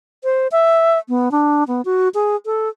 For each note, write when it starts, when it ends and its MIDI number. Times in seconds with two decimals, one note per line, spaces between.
0.24 0.47 72
0.52 0.99 76
1.09 1.31 59
1.31 1.64 62
1.68 1.81 59
1.85 2.08 66
2.14 2.36 68
2.46 2.69 69